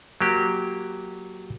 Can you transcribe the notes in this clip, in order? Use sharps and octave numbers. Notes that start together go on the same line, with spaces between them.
F#3 A#3 G4